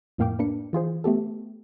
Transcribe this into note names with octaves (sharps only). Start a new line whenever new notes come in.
F2 A2 A#3 F5 G5 D6
A#3 D4 B4 C#7
E3 F4 G#4 C5
A3 B3 G4 A4